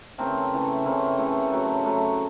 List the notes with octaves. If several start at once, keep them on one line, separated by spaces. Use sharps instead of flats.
C#3 E3 A3 A#3 C4
C#3 E3 A3
C#3 E3 A3 A#3 C4
C#3 E3 A3
A2 F#3 A3
A2 F#3 A3